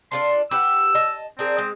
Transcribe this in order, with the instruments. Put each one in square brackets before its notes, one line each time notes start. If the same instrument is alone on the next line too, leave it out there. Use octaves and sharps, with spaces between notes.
[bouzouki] D4 F4 A4 [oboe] C6
[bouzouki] G4 B4 F#5 [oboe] E6
[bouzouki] D#5 A5
[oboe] C4 [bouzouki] D4 G#4 A#4
[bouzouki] G#3